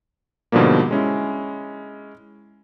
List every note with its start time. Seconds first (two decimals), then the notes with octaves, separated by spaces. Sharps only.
0.52 G#2 B2 D3 F3 G3 A#3
0.91 G#3 C#4 E4